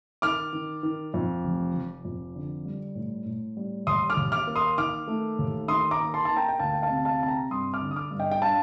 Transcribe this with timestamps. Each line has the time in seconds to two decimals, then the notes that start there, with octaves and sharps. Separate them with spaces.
0.22 D#3 D6 F6
0.53 D#3
0.83 D#3
1.14 F2
1.44 F1
1.74 F1
2.05 F2
2.35 D3
2.65 G3
2.95 A2
3.26 A2
3.57 G3
3.87 D#2 C6 D#6
4.10 D6 F6
4.17 D#2
4.32 D6 F6
4.47 A#3
4.55 C6 D#6
4.78 D#3 D6 F6
5.08 A3
5.39 D#2
5.68 D#3 C6 D#6
5.91 A#5 D6
5.99 A#3
6.14 A5 C6
6.25 A#3 A5
6.37 G5 A#5
6.49 G5
6.59 D2 F5 A5
6.74 G5
6.82 F5 A5
6.90 C3
7.05 F5 A5
7.20 C3 A5
7.28 G5 A#5
7.50 G2 C6 D#6
7.74 D6 F6
7.81 D3
7.91 D#6
7.96 D6 F6
8.11 G2
8.19 D#5 G5
8.32 G5
8.42 D4 F5 A5